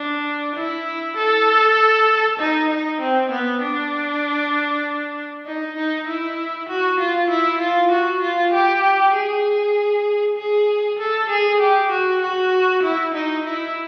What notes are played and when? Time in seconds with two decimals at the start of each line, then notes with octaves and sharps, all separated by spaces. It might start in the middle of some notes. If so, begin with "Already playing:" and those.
Already playing: D4
0.55 E4
1.17 A4
2.39 D#4
2.70 D#4
3.00 C4
3.31 B3
3.62 D4
5.46 D#4
5.76 D#4
6.07 E4
6.69 F#4
6.99 F4
7.30 E4
7.60 F4
7.91 F#4
8.22 F4
8.53 G4
9.14 G#4
10.37 G#4
10.99 A4
11.30 G#4
11.60 G4
11.91 F#4
12.21 F#4
12.83 E4
13.14 D#4
13.44 E4